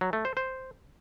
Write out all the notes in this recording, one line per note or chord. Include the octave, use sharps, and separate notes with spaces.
F#3
A3
C5
C5